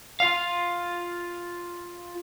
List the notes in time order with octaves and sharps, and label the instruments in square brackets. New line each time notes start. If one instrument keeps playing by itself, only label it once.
[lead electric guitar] F4 F5